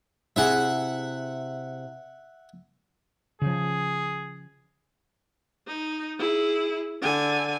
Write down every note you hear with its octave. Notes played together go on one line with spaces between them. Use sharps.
C3 E4 G#4 E5 F#5
C#3 F3 G#4
D#4
E4 G#4
D3 G#5